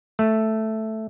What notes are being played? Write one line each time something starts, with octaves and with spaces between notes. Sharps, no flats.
A3